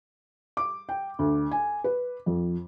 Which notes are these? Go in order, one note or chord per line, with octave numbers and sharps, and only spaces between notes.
D6
G5
D2
G#5
B4
F2